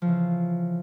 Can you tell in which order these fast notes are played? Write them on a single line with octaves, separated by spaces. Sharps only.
F3 C#3 E3